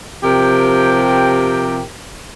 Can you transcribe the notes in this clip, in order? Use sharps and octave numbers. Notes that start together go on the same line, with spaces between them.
C3 F3 G4 A#4 G5